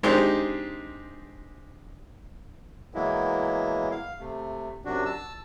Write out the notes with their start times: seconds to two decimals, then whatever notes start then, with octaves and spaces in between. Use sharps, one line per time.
0.03 G#3 C4 D4 D#4 G4
2.94 E3 F#3 G#3 A#3 B3 E4
3.91 F5
4.20 C3 A3
4.85 F#2 C3 D4 F#4
5.05 A5 E6